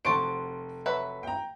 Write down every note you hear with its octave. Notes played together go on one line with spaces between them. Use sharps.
F1 F#4 C5 A5 C#6 D7
F#3 B4 E5
G5 A#5